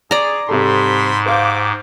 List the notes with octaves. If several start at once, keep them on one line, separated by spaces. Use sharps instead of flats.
C#4 G#4 D5 A#5
G#2 C3 G3 A4 C5 B5 C6
G4 C5 F5 F#5 D6 G6